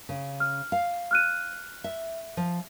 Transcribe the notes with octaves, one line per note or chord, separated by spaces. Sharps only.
C#3
F6
F5
F6 F#6 D#7
E5
F3